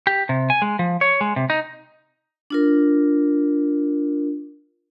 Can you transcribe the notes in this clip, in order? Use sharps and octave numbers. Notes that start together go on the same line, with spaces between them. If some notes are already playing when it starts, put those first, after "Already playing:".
G4
C3
G#5
G#3
F3
C#5
G#3
C3
D#4
D4 F4 A#4